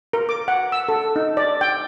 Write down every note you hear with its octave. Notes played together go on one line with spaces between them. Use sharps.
A#4
D6
F#5
E6
A4
D#4
D5
G5